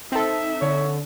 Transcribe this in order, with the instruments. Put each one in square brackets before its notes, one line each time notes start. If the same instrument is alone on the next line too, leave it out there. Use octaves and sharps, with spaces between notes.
[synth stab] C4 A4 [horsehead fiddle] D#4 E5
[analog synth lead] D3 [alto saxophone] C#5